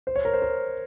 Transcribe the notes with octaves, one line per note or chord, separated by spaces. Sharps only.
C5
C#5
A#4
C5
A#4